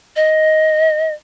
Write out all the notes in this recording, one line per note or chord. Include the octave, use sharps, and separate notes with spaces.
D#5